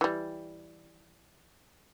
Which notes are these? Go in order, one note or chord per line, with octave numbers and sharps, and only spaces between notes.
E3 G3